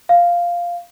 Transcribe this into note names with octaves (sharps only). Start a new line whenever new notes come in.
F5